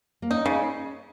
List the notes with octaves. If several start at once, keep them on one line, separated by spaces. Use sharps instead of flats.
A#3
C#4 D#4
C#3 D#4